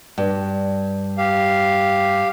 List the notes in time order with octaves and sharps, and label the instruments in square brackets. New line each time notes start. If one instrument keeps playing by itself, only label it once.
[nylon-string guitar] G2
[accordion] G4 F5